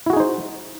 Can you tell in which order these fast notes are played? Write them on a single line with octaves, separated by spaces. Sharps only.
E4 F#4 G#4 D#4 C5